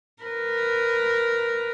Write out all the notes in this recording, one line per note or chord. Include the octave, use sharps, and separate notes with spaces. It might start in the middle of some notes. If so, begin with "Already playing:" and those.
A#4 B4